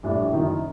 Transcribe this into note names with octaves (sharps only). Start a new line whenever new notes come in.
A#1 A2 G3 D4
F#1 F#2 D#3 F#3